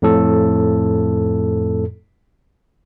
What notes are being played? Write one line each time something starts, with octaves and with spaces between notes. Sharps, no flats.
F2 A2 A4